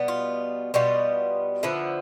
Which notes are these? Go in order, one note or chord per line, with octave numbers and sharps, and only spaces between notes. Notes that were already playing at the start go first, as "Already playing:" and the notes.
Already playing: B2 G3 B3
F4
B2 G3 B3 F4
D3 F3 B3 E4